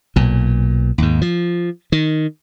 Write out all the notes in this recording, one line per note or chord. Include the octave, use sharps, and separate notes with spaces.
B1 A#2
D#2 G#2
F3
D#3